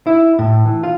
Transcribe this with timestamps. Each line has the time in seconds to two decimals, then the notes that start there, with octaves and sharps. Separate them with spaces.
0.07 E4
0.39 A2
0.66 E3
0.83 F4